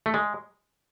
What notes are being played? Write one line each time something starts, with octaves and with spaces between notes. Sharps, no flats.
A3
G#3